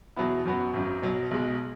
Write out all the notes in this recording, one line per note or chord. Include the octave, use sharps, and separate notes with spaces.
E2 B2 F#3 B3 E4
F#2 F#3 B3 F#4
G#1 F#2 F#3
B1 B2 F#3
B1 B2 G#3